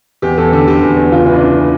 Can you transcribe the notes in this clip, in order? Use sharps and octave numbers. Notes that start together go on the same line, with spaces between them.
E2 G4
E2 A4
D3 G4
D3 G4
E2
E2
C#2 F4
E3
D4
C#2
C#3